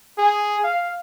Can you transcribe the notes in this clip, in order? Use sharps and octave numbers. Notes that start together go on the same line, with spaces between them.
G#4
F5